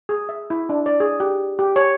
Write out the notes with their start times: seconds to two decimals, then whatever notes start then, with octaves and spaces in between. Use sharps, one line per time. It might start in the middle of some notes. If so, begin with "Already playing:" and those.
0.09 G#4
0.29 E5
0.50 E4
0.69 D4
0.86 D5
1.00 G#4
1.20 G4
1.59 G4
1.76 C#5